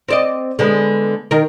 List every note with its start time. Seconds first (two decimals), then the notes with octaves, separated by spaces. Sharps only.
0.08 C4 D5 D#5
0.59 D3 G#3 B3
1.31 D#3 A#4